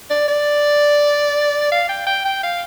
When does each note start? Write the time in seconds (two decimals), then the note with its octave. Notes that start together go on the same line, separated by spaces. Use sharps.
0.10 D5
0.28 D5
1.72 F5
1.89 G5
2.07 G5
2.25 G5
2.43 F5